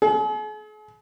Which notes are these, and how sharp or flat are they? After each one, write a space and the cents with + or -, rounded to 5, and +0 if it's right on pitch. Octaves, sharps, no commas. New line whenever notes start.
G#4 +45